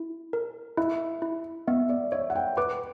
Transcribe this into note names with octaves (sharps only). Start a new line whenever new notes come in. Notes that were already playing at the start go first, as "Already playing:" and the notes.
Already playing: E4
A#4
E4 E5
E4
B3 E5
D5
C#5 E5
F#5
G5
B4 D6